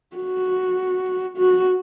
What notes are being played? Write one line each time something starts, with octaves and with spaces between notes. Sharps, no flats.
F#4
F#4